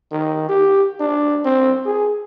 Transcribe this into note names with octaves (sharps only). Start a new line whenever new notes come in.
D#3
G4
D4
C4
G#4